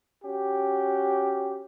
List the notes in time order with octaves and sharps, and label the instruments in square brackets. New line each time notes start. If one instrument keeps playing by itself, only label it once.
[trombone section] C#4 F#4 G4